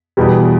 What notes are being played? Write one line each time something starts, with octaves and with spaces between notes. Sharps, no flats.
E2 B2 G3